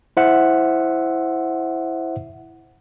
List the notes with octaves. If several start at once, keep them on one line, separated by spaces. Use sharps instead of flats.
E4 C5 E5 F#5